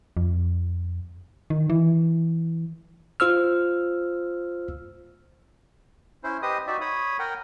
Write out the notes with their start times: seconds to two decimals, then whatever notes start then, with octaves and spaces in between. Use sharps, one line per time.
0.17 F2
1.50 D#3
1.70 E3
3.20 F4 C5 E6 F6
6.24 C#4 E4 C5
6.42 G4 B4 C5 D#5 D#6
6.67 D#4 F#4 D5 E5
6.81 C#5 B5 D#6
7.19 A#4 F#5 G5